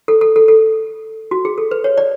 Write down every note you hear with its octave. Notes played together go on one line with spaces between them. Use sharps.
A4
A4
A4
A4
F#4
G#4
A4
B4
C#5
D5